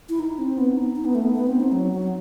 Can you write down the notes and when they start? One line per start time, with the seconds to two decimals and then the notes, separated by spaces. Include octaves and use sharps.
0.09 E4
0.20 D#4
0.39 C4
0.58 B3
0.77 D#4
0.96 D#4
1.05 B3
1.15 A3
1.24 B3
1.34 B3
1.47 C4
1.60 D#4
1.72 F#3
1.92 F#3